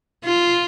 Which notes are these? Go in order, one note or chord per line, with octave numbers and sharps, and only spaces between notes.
F4